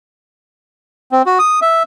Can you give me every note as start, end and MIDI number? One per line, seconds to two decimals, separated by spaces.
1.12 1.22 60
1.26 1.38 66
1.39 1.60 87
1.62 1.83 76